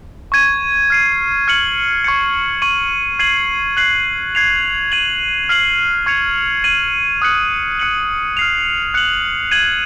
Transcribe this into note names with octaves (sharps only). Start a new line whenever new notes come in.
C#6 G#6 D#7
F6 C7 D#7
F6 G#6 C#7 F#7
C#6 G#6 C#7
C#6 G#6 D#7 F#7
G#6 C7 D#7 F#7
F#6 C7 F#7
G#6 C7 F7
G#6 D#7 F#7
F6 C7 F#7
C#6 G#6 C#7 F7
G#6 D#7 F#7
D#6 F#6 C#7 F#7
F#6 C#7 F#7
F6 C7 F7
F#6 C#7 F#7
G#6 D#7 F#7